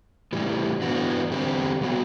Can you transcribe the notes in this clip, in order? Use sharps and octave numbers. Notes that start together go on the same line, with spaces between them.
A2 E3 G3
G2 E3 B3 D4 F#4
E2 D3 G3 C4 G4
B2 G3 B3 F#4